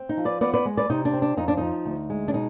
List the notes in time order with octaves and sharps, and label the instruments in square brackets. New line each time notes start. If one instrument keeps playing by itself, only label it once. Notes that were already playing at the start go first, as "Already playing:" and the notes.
Already playing: [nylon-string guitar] C4
D#4
F3
B4 D5
B3 B4 D5
B4 D5
G#3
B4 D5
C3 D#4
D4
C4
D4
F2 D#4
D4
F3 D#4
D2
G#3
D4
B2 D#4